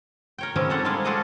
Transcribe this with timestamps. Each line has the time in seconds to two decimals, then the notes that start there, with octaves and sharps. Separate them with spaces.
0.38 A#4 C#5 G5
0.56 D#3 F3 G3 G#3 C4 C#4
0.70 G3 A4 C5 C#5 F#5
0.85 G#3 A#3 E4 F4 G#4 F5
1.05 F4 F#4 G#4 A4 D5 D#5